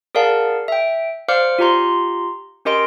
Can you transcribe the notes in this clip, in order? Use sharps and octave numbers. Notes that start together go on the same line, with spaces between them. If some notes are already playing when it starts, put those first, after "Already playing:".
G#4 A#4 D5 F5 F#5 A5
E5 G5
C5 D5 F5 D6 F6 C#7
F4 G4 A#5 C6
C#4 G4 A#4 D#5 C6 D7